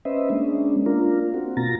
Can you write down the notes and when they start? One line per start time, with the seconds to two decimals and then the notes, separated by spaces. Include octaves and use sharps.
0.05 C#4 B4 C5 D#5 E5
0.30 G#3 A#3 C#4 D4
0.86 A#3 D4 F4 A#4
1.34 C4 F#4
1.57 B2 A#3 F4 A#5 A6 A#6